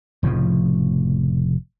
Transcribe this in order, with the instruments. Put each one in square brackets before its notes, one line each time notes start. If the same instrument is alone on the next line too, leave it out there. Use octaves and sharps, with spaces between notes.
[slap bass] F1 A2 C#3 F3